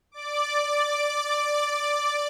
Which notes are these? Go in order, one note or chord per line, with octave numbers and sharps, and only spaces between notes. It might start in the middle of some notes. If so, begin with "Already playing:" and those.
D5 D6